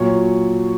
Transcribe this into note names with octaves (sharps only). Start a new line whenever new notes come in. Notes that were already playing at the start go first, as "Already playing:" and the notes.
Already playing: A#2 F#3 C#5 C#6